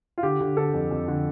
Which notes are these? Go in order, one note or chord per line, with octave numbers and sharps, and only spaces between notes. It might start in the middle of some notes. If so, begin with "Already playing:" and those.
F4
D3 G4
D3
D3 A4
F2
F2
D3